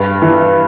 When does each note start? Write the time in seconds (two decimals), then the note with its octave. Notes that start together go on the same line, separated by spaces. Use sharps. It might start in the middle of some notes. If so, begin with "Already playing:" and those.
Already playing: G2
0.22 E3